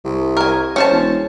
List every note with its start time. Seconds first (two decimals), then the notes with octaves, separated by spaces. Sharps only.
0.04 C2
0.37 A#4 G#5
0.76 C#4 C5 A5
0.91 E1